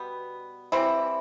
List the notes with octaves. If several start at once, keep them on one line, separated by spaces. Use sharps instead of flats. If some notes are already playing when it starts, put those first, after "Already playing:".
Already playing: B2 G3 B3
E3 G3 B3 C4 E4